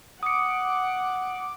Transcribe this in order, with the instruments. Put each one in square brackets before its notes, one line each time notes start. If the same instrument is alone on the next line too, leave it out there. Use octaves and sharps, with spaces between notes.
[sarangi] F#5 [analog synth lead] D6 [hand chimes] D#6 C#7